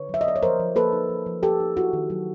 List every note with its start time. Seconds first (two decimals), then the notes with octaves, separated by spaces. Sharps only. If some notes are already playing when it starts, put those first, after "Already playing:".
Already playing: D3 B4 C#5
0.09 F#3 E5
0.21 D#5
0.26 B3 D5
0.36 C#5
0.43 F3 A#4 C5
0.60 F3
0.75 A#3 A4 B4
0.92 D#4
1.10 F3
1.26 F3
1.43 A#3 G4 A4
1.60 D#4
1.77 E4 F#4
1.93 D#3
2.10 F#3